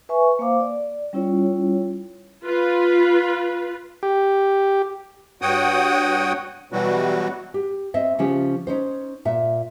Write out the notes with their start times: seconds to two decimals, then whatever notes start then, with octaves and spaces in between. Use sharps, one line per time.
0.09 B4 E5 G#5 C#6
0.39 A#3 C5 F5 D6
0.60 D5
1.13 G3 C#4 E4 F4 C#5
2.45 F4 B4
4.03 G4
5.42 G2 F#4 C#5 F#5 G5 D#6
6.72 B2 E3 F#3 G3 F#4
7.54 G4
7.94 C4 D#5 E5
8.19 C#3 F3 C#4 G4
8.67 C#4 D#4 C5
9.25 A#2 E5